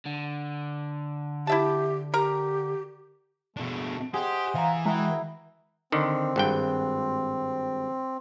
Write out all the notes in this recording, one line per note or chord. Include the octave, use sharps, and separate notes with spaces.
D3
E4 G4 E5 A5
G4 A#4 A#5
B2 A3 D4
G4 G#4 C5 D#5 F#5
E3 F5 A#5
G#3 E4 F#4 G#4 G5 A#5
D3 D#3 C4
G#1 G2 G5